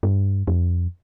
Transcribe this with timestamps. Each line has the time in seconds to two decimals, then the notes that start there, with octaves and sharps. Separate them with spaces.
0.03 G2
0.47 F2